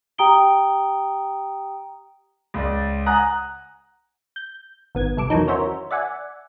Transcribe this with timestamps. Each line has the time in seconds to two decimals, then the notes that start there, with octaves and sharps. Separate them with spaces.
0.18 G4 G5 A#5 D#6 D7 G7
2.54 C#2 D5
3.06 F#5 G#5 A#5 D#6 F#6
4.36 G6
4.95 G#1 B3 G#6
5.17 C2 A4 D6
5.30 E2 D#3 E3 F#3 D#4
5.48 C#4 F#4 A#4 C5 E5
5.91 D5 E5 F#5 G#5